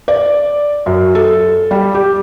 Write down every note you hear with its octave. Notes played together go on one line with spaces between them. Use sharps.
D5
F#2
A4
G3
G4